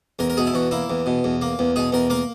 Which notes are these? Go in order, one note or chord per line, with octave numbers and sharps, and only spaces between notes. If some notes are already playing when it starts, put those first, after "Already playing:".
E2 A#4
A#4
B2 G#4
E4
E2 F#4
A#3 E4
E2
B2
E2
A#3
E2
B2 G#4
E2 A#4
A#3 A#4